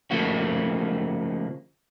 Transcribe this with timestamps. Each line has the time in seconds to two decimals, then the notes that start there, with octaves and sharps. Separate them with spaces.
0.11 C#3 F3 A3 A#3 F#4